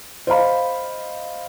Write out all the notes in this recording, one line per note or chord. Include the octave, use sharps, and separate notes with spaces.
C5 D#5 F5 B5